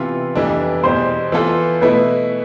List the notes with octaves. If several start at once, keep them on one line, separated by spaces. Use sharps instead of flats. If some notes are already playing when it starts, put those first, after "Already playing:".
Already playing: C3 E3 B3 F4
F2 E3 G3 B3 D4
E2 B2 G3 C5
E3 B3 F4 A4
B2 A3 E4 B4